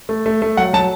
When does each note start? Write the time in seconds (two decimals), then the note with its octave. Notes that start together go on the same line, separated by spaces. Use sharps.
0.09 A3
0.26 A3
0.42 A3
0.57 F#3 F#5
0.73 F#3 A5